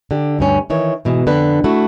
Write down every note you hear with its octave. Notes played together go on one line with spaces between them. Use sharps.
D3 G4
D2 G2 C#4
D#3 E3 C#5
G#2 B2 E3
F2 D3 B4
A3 E4 F#4